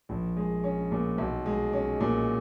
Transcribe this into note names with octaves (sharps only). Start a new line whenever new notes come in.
A#1
G#3
C#4
A#2
B1
G#3
C#4
A#2